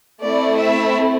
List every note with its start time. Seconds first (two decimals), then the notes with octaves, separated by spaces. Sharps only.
0.23 A3 C4 E4 D5
0.59 E5